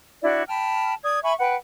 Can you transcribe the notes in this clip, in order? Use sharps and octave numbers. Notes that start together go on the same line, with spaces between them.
D4 E4 F#4 D5
G5 A5 B5 F6
D5 D#6 G#6
E5 G#5 B5 C#6
B4 F#5 G5